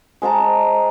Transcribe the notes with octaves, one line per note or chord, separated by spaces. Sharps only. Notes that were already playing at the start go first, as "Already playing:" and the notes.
G#3 C5 A5 A#5